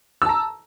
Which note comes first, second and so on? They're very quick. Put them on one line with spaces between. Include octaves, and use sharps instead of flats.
E6 A5 A#5